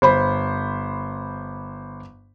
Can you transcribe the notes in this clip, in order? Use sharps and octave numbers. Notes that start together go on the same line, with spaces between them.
G1 C5 B5